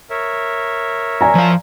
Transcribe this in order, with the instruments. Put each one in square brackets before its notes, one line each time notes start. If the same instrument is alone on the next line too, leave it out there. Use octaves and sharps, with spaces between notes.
[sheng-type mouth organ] A#4 C#5 E5
[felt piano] D5 G#5 A#5
[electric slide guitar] F3 F5